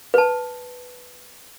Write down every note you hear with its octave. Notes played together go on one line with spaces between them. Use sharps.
B4 A5